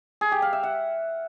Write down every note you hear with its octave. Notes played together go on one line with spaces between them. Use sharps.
G#4
G4
F5
E5
F#5